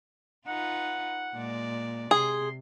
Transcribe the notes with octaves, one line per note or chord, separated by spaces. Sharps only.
D#4 F4 B4 F#5
A#2 G#3 D5
C3 G#4 C6